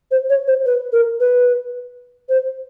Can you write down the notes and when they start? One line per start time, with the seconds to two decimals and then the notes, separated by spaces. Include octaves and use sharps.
0.11 C5
0.30 C#5
0.47 C5
0.66 B4
0.92 A#4
1.20 B4
2.29 C5